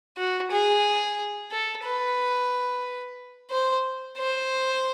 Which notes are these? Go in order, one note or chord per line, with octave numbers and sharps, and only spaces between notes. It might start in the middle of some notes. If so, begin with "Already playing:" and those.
F#4
G#4
A4
B4
C5
C5